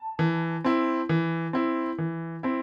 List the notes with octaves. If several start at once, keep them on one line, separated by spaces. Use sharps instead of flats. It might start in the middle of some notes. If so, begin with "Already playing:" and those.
Already playing: A5
E3
C4 E4
E3
C4 E4
E3
C4 E4